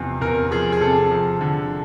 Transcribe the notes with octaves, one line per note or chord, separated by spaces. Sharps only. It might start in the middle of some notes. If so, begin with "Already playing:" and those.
Already playing: E2 C3 F3
E2 A#4
F3 G#4
G#4
C3 A4
F3
D3